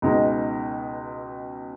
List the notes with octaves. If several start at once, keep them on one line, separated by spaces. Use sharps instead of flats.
C#2 B2 G#3 D#4